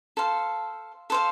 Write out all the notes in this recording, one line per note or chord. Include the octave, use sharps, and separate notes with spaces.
A4 C5 F5
A4 C5 F5